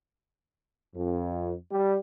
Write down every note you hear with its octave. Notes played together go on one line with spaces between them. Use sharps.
F2
G3